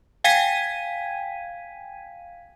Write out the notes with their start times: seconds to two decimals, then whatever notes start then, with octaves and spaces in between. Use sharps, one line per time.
0.24 F5 G5 G#5 G#6 B6 D#7